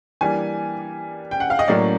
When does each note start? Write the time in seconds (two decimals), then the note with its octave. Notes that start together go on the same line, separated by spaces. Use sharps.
0.21 E3 G3 A#3 D4 G#5
1.31 G5
1.40 F#5
1.50 F5
1.59 D#5
1.68 A2 F#3 A#3 C#4 D5